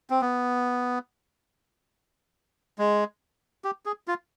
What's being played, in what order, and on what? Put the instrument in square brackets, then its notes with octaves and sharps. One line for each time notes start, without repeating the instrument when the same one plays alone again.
[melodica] C4
B3
G#3
G4
G#4
F4